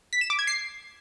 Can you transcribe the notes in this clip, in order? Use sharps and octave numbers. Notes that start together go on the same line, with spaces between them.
B6
E7
D6
G#6
C7